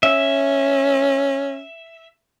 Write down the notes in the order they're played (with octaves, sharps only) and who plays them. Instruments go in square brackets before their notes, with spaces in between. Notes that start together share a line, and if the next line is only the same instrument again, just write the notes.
[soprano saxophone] C#4 [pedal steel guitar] E5